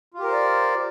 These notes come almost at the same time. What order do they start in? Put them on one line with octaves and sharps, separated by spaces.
F4 G4 A#4 C5 D5